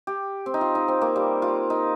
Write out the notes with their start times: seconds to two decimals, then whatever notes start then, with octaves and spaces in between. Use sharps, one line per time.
0.07 G4
0.46 C4
0.54 D#4
0.61 F4
0.75 D#4
0.88 C4
1.01 A#3
1.16 G3
1.42 F4
1.70 D#4